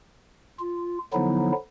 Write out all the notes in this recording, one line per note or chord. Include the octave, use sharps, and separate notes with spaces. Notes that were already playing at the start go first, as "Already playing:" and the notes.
F4
D3 F3 F#3 B3 D#4 E4